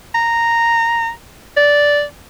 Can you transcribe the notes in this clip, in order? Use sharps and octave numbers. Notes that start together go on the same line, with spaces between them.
A#5
D5